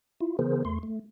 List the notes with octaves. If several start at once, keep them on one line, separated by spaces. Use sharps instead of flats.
E4 F4
C#3 E3 B3 G#4 A#4 C5
E2 A3 C6
A3